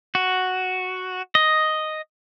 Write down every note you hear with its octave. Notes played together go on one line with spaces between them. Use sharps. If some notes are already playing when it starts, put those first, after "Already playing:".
F#4
D#5